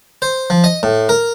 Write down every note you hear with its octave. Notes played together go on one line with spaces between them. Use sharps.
C5
F3
D#5
A2
A#4